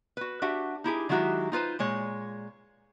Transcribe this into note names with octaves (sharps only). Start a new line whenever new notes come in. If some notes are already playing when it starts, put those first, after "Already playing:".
F#4 B4
D4 F#4 G4 E5 F#5
D#4 E4 G4 G#4
D#3 F#3 G#3 E4 F#4 G4
D#4 F4 B4 C5
A#2 G#3 C#5